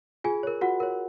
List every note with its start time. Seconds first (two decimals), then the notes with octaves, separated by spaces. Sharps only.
0.24 F4 G#4 G#5
0.43 A#4 C#5
0.61 F4 F#4 F#5
0.80 A#4 C#5